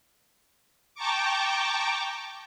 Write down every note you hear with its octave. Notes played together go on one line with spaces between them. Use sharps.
G5 A5 A#5 C#6 D6